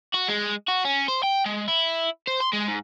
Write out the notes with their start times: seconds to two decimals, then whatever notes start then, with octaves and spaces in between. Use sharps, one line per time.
0.14 F#4
0.28 G#3
0.68 F#4
0.85 C#4
1.08 C5
1.23 G5
1.46 G#3
1.68 E4
2.27 C5
2.40 C6
2.53 G#3
2.68 G#2